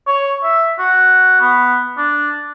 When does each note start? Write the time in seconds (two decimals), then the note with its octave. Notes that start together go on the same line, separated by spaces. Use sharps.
0.07 C#5
0.43 E5
0.79 F#4
1.41 B3
1.98 D4